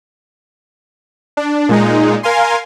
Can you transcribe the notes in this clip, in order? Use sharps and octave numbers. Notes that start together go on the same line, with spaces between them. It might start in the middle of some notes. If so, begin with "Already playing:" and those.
D4
A#2 G#3 D#4
A#4 F5 G#5 C6